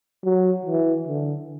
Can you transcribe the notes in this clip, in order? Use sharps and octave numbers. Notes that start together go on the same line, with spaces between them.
F#3
E3
D3